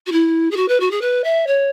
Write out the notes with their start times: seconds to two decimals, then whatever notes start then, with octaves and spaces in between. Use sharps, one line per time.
0.06 F#4
0.12 E4
0.50 G#4
0.56 F#4
0.68 B4
0.80 F#4
0.91 G#4
1.01 B4
1.24 E5
1.47 C#5